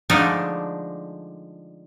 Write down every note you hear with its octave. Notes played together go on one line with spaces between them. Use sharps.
D3 F3 G#3 A3 D4 D#4